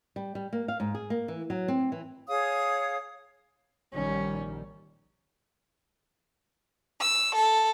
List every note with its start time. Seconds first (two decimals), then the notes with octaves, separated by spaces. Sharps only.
0.16 G3
0.35 G3
0.53 A#3
0.68 F5
0.80 G#2
0.95 G#4
1.10 A#3
1.28 E3
1.50 F#3
1.68 C4
1.92 E3
2.28 G#4 C#5 F5 D#6
3.94 A#1 D#3 G3 C#4
7.00 E6
7.35 A4